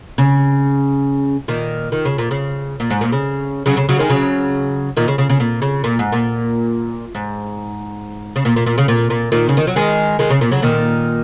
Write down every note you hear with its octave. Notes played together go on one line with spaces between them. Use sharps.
C#3
A#2 D#3
D#3
C#3
A#2
C#3
A#2
G#2
A#2
C#3
C#3 F#3
C#3
C#3 F#3
D#3 G#3
C#3 F#3
A#2 D#3
C#3
C#3
C#3
A#2
C#3
A#2
G#2
A#2
G#2
C#3
A#2
A#2
A#2
C#3
A#2
A#2
A#2 D#3
C#3
D#3
F#3
D#3 G#3
D#3 G#3
C#3
A#2
C#3 F#3
A#2 D#3